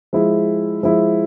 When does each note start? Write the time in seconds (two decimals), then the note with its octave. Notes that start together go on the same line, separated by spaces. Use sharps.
0.13 F3 G#3 E4
0.83 F3 G#3 E4